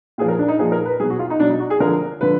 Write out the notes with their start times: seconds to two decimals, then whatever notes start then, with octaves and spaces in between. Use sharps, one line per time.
0.18 A#2 F3 G#4
0.28 A#4
0.39 D4
0.48 D#4
0.59 A#2 F3 G#4
0.72 A#4
0.85 B4
1.00 B2 F#3 G#4
1.10 F#4
1.19 F4
1.30 D#4
1.39 B2 D4
1.42 F#3
1.50 D#4
1.60 F#4
1.70 G#4
1.80 D3 F3 A#4
2.21 D3 F3 B4